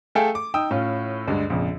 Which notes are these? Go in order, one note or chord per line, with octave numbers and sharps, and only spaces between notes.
A3 G#4 A4 F5 G5 G#5
D6
D#4 G5 D#6 E6
A2 C#4 F4
D2 G2 D3 G#3
A#1 F2 C#3